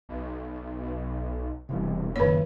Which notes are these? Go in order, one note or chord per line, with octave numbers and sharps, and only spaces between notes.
B1
E1 C3 E3 G3
C#2 F#2 A#2 D#3 C#5